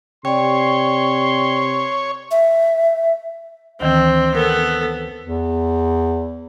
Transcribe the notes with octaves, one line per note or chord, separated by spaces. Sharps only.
C3 C#5 D5 G5 C6
E5
D2 D#3 E3 C4
B3 A4 A#4
E2